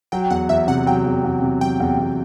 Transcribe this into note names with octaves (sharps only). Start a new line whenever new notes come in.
F#3 G5
E2 F#5
E2 E5
C3 F#5
F#3 G5
E2
E2
C3
F#3 G5
E2
E2